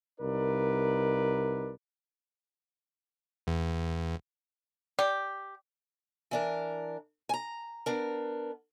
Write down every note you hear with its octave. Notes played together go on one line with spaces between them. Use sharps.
C2 D#4 A#4 B4 D5
E2
G4 D5
E3 D4 A#4
G#5 A#5
B3 D4 A#4